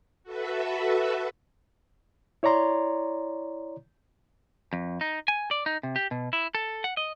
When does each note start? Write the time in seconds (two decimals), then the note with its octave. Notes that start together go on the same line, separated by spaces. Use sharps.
0.23 F#4 A4 B4 E5
2.43 E4 C#5 D5 A#5 C6
4.73 F2
5.01 D#4
5.28 G#5
5.51 D5
5.66 D#4
5.83 C3
5.96 G4
6.11 B2
6.33 E4
6.55 A4
6.84 F#5
6.97 D#5